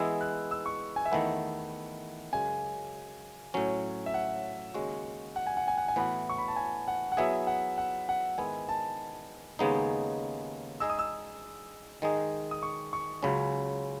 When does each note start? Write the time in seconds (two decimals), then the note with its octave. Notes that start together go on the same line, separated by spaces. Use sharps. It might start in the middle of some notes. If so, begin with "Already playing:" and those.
Already playing: E3 G#3 B3 E4 G#4 E6
0.21 F#6
0.51 E6
0.66 C#6
0.96 G#5
1.06 E5
1.12 E2 D#3 A3 E4 B4 F#5
2.33 F#2 C#3 G#3 G#5
3.54 A2 F#3 C#4
4.06 E5
4.14 F#5
4.74 D#2 C#3 G#3 C#4 F#4
5.36 F#5
5.47 G#5
5.57 F#5
5.68 G#5
5.78 F#5
5.88 G#5
5.96 A2 E3 B3 F#4 B4 F#5
6.29 C#6
6.38 B5
6.48 A5
6.56 G#5
6.88 F#5
7.12 F#5
7.17 F#3 B3 E4 G#4 E5
7.47 F#5
7.78 F#5
8.09 F#5
8.38 G#2 D#3 G#3 B3 E4 G#5
8.69 A5
9.59 D#2 C#3 G#3 B3 D#4
10.80 G#3 D#4 G#4 D#5 E6
10.90 D#6
10.99 E6
12.02 D#3 G#3 D#4 G#4
12.51 D#6
12.63 C#6
12.93 C#6
13.23 C#2 C#3 F#3 C#4 B5